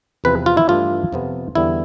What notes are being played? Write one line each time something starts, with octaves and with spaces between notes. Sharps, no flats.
E2 C3 F3 C4 B4
F4
E4
G2 E3 A3 D4 F4
F2 C3 F3 B3
E2 D3 G3 B3 E4